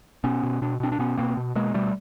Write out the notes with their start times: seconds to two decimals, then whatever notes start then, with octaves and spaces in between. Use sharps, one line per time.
0.24 B2 B3 C#4
0.43 B2
0.62 B2 D4
0.80 B2 C4 D4
0.92 D4
0.99 B2 B3 C#4
1.17 B2 A#3 C4
1.37 B2
1.56 B2 G#3 A#3
1.74 B2 G3 A3